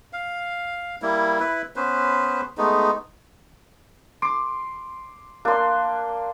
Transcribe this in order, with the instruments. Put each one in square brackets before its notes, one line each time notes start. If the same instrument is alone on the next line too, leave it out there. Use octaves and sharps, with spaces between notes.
[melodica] F5
G3 A#3 E4
E4 B4
B3 C#4 B4 C5
G#3 A3 B3 D#4
[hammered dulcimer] C6 D6
[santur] A#3 C6 [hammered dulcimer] D4